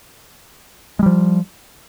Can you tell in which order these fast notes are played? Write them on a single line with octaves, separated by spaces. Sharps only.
G#3 G3 F3